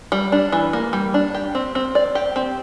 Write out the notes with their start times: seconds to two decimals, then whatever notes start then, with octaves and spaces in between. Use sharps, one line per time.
0.12 G3
0.32 D4
0.52 E3
0.73 A#3
0.93 G3
1.14 D4
1.35 G4
1.55 C4
1.75 C4
1.95 D5
2.15 G4
2.36 C4